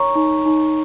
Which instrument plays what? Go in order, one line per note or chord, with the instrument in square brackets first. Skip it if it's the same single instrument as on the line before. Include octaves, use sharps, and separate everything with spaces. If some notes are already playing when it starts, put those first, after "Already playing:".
Already playing: [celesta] D#4 A#4 C#5 A#5 C#6
D#4
D#4